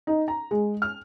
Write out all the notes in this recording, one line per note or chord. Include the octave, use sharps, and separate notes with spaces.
D#4
A#5
G#3
F6